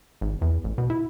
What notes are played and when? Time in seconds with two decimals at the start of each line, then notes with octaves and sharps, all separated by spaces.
0.21 G#1
0.42 E2
0.64 A1
0.78 B2
0.90 E4